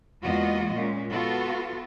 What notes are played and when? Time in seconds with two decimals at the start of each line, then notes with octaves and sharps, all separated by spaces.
0.23 E2 G#3 A#3 F4 F#4 D#5
0.74 A#2 G#3 C#4
1.11 B3 F4 F#4 A4